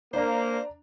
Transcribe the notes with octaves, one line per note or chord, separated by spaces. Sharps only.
A#3 D4 C5 D5 A#5